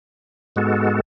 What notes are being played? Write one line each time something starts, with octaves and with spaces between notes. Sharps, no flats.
G#2 G#3 B3 F#4 A4